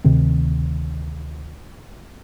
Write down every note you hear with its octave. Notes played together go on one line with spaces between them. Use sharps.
D2 C3 D#3 C4